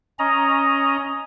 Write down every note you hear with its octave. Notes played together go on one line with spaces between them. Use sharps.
C#4 D#5 A#5